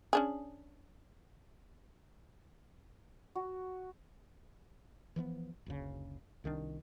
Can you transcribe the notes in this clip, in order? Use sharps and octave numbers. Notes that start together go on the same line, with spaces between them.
C#4 D4 G#4
F#4
E3 F3 A3 B3
F#1 D2 C#3
C2 D#3 F#3 D4